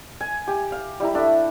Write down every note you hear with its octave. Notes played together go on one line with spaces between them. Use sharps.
G#5
G4
F5
G3 E4 A#5
A3 D4 E5 E6